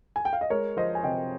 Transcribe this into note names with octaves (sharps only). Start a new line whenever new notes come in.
G#5
G5
F5
D#5
G#3 A#4 C#5
F3 C5 D#5
G#5
C3 D#5 G5